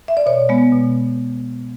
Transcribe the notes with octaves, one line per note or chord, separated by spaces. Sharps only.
E5
D5
B2 C#5
G#3 B3
B2